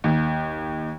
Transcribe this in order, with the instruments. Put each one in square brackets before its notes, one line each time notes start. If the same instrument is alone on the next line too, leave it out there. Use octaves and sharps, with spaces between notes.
[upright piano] D#2